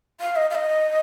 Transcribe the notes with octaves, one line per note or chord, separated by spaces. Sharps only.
F5
D#5
F5
D#5